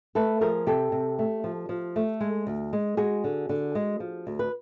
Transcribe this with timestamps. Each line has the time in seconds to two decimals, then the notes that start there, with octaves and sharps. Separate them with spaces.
0.15 A3 A4 B4
0.41 F3 G#4 A#4
0.66 C3 G4 A4
0.92 C3
1.19 A3
1.44 F3
1.69 F3
1.96 A3
2.20 G#3
2.47 D2
2.73 G#3
2.97 G#3 F#4 G#4
3.24 D3
3.49 D3
3.75 G#3
4.00 F3
4.27 D2
4.39 B4